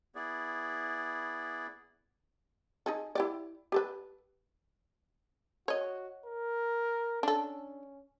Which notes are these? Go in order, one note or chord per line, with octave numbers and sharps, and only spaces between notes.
B3 E4 G#4 D5
D#4 G#4 A4
E4 G4 D5
G4 A4 B4
F#4 C#5 D#5
A#4
C#4 D4 A4